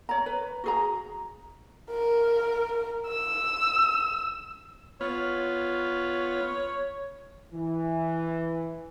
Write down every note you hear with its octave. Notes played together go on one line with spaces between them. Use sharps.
C#5 A#5
B4
F#4 G#4 A#5
A#4
E6
B3 F4 C#5
E3